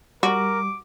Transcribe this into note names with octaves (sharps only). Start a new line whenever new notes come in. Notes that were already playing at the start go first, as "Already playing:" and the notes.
G3 F#4 A#4 D6